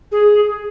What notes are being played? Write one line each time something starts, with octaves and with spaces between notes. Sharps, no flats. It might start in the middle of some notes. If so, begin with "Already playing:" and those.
G#4